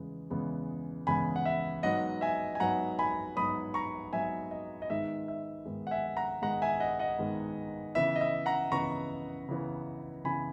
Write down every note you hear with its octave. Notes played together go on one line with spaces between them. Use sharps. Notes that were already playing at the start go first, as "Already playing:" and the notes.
Already playing: E2 C#3 G#3 B3
E2 C#3 G#3 B3
E2 C#3 G#3 B3 G#5 B5
F#5
E5
G#2 F#3 B3 D#5 F#5
E5 G#5
G#5
G#2 F#3 B3 F#5 A#5
G#5 B5
G#2 F#3 B3 B5 D#6
A#5 C#6
G#2 F#3 B3 E5 G#5
D#5
D#5
G#2 D#3 G#3 B3 E5
E5
G#2 D#3 G#3 B3
F#5
E5 G#5
F#5 A#5
G#2 D#3 G#3 B3 F#5 A#5
E5 G#5
D#5 F#5
D#5 F#5
G#2 D#3 G#3 B3
C#3 E3 B3 E5
D#5
E5
F#5 A#5
C#3 E3 B3 A#5 C#6
C#3 E3 B3
C#3 E3 B3 G#5 B5